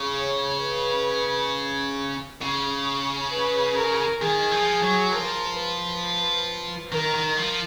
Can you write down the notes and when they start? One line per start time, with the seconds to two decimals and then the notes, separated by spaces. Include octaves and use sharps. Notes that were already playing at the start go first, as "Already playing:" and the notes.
Already playing: C#3
0.16 C#5
0.61 B4
2.42 C#3
3.32 B4
3.76 A#4
4.22 D#3 G#4
4.51 F3
4.82 F#3
5.12 F3 A#4
5.58 B4
6.92 D#3 A#4
7.15 D#3
7.37 F3